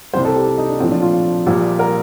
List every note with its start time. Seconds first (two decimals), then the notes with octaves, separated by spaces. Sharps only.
0.13 C2 C3 G3 C5
0.25 A4
0.36 G4
0.47 C4
0.58 D#4
0.69 D4
0.80 A#1 A2 F3 C4
0.91 D4
1.02 F4
1.46 A#1 A#2 G3
1.79 A#4